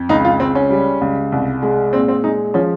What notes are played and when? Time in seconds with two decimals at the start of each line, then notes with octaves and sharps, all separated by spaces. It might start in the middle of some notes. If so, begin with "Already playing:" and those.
Already playing: F2
0.09 C#2 D#4
0.25 F4
0.40 C#2 C4
0.55 C#4
0.70 G3
1.01 C#2
1.32 C2
1.63 G#3
1.93 A#2 C4
2.08 C4
2.24 G#3 D#4
2.54 F3 C#4